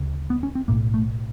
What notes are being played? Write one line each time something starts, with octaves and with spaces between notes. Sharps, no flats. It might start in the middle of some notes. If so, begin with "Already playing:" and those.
Already playing: D2 C#3
B3
C#4
C4
B1 A2 A#3
A3